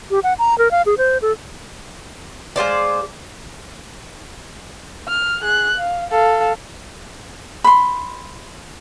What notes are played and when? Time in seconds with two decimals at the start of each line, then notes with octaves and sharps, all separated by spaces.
0.10 G4
0.23 F#5
0.39 A#5
0.58 A#4
0.71 F5
0.86 G#4
0.98 C5
1.22 A4
2.56 G#3 F4 C5 D5
5.08 F6
5.41 G#4 F#6
5.78 F5
6.10 A4 F5
7.64 B5 C6